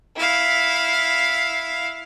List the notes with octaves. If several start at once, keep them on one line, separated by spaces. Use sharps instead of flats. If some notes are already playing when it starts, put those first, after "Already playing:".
E4 F5